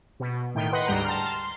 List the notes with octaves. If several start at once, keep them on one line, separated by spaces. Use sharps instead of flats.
B2
A2 D#3 G5
B4 D#5 F#5 C6
D2 G#2 G3 G5 A#5
A5 A#5 C6 F6
C6